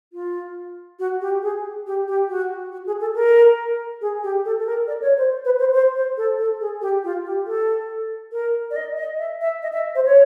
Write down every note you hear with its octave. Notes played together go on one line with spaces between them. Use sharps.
F4
F#4
G4
G#4
G4
G4
F#4
F#4
G#4
A4
A#4
G#4
G4
A4
A4
A#4
D5
C#5
C5
B4
C5
C5
C5
A4
A4
G#4
G4
F4
G4
A4
A#4
D5
D#5
D#5
E5
E5
D#5
E5
C5
C#5